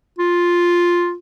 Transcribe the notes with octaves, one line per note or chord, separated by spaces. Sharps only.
F4